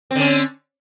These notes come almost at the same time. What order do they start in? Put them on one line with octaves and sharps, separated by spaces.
C4 D3 C#4